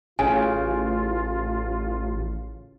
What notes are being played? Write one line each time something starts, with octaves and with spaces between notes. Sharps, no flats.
A1 C#3 F4 G#5